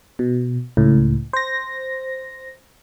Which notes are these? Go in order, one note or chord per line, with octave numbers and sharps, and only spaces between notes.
B2
C#2 A2
C5 A#6